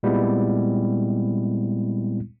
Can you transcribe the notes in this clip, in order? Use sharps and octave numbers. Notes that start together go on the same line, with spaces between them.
A#2 G3 G#3 B3 C4 E4